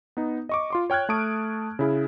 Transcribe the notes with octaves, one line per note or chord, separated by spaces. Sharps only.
B3 D#4
D#5 C#6 D6
F4 C6 D6
C#5 G5 F6 F#6 G#6
A3 A5 C#6 D#6 D7
C#3 E4 G#4